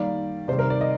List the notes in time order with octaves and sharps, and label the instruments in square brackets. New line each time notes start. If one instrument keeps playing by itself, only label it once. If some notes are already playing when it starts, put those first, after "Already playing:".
Already playing: [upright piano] D#3 G3 A#3 D5
C3 D#3 G3 C5
A#4
D5
D#5